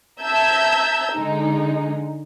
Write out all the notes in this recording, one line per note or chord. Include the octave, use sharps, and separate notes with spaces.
E5 A5 A#5 E6 G6 G#6
D3 G#3 D#4